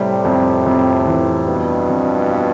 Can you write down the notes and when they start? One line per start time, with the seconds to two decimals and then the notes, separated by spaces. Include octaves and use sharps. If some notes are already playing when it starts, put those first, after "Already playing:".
Already playing: A2 C3 G3
0.25 F2
0.66 F2
1.06 E3
1.47 G2 B2 B3
1.89 F2
2.29 F4